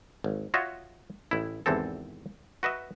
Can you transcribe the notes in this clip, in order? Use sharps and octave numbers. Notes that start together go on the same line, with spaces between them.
G#1
F4 F#4 C#5 D#5 E5
A1 E4
G#1 E2 C3 E3 C4 A4
F#4 B4 D#5 E5